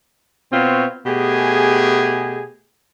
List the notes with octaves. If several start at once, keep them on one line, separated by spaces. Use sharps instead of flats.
B2 C4 F4 B4 C#5
B2 A3 G4 G#4